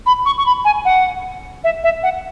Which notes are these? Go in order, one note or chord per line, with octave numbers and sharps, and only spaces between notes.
B5
C#6
C#6
B5
G#5
F#5
E5
E5
F#5